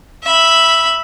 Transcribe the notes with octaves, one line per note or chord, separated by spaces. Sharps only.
E5 B5